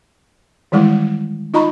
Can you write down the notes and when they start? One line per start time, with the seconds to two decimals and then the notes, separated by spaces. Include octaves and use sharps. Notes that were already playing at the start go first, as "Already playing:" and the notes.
0.72 D#3 E3 G3 G#3 E4
1.54 D#4 F4 D#5 A#5 B5 C#6